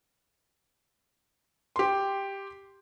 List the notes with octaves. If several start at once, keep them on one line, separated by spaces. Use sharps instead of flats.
G4 C6